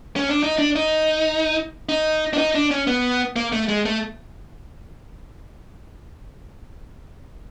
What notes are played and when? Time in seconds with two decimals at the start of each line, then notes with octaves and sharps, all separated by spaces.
0.16 C#4
0.29 D4
0.43 D#4
0.58 D4
0.76 D#4
1.89 D#4
2.33 D4
2.38 D#4
2.55 D4
2.71 C#4
2.87 B3
3.36 A#3
3.52 A3
3.69 G#3
3.86 A3